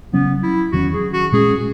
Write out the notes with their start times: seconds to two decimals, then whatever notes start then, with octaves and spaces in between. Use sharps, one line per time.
0.12 C#3 F#3 B3 C#4
0.43 E4
0.72 E2 D#3 F#3 C#4 F#4
0.93 G#4
1.13 F#4
1.32 A#2 G#3 C#4 G#4